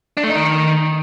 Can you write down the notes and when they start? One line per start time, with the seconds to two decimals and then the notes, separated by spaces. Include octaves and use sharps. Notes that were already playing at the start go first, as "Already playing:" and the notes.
0.17 D4
0.23 A3
0.29 D#4
0.35 D#3